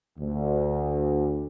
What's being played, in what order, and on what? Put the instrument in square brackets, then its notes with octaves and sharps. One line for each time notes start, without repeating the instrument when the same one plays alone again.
[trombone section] D2